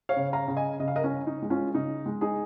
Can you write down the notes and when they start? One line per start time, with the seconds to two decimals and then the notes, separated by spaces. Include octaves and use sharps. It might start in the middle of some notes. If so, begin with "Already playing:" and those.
0.09 C#5 F5
0.16 C#3
0.33 F5 A#5
0.48 C#3
0.57 D#5 G#5
0.80 C#3 D#5
0.88 F5
0.96 A#4 D#5
1.04 C#4
1.11 C#3
1.27 D#4
1.42 G#3
1.50 C#4 F4
1.74 C#3 D#4
2.06 G#3
2.21 D#4 G#4